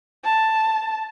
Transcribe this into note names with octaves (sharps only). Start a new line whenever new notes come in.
A5